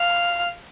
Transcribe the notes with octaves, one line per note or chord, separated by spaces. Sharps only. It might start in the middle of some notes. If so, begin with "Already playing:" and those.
Already playing: F5